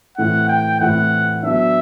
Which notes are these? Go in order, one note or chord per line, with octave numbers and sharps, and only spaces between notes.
A2 E3 A3 C4 E4 F#5
G5
A2 E3 A3 C4 E4 F#5
F#3 B3 D4 E5